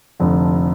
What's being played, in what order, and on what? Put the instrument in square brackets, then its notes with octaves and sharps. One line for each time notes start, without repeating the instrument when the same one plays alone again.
[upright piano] F1 F2 D3